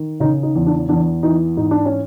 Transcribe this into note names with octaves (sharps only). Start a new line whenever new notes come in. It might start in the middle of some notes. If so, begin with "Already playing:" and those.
Already playing: D#3
C#3 D#4
D#4
E2
D4
E2 D4
E3 D#4
G#2 D#4
D4
C#4